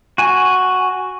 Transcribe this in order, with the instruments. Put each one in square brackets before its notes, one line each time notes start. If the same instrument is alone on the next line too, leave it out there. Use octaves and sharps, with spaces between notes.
[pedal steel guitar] F#4 G#5